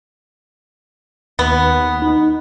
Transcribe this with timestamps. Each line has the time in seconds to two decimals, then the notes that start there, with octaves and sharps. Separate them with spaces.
1.39 D#2 B3
2.02 D#4